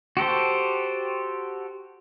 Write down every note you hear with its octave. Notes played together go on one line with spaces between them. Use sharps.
F#4 G4 A4 C5